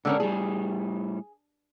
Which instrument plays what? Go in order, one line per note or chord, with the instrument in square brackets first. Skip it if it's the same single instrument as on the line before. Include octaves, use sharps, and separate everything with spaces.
[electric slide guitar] G#2 A#4 [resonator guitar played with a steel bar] D3 C4 C#4
[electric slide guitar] A2 G3 [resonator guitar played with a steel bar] G#4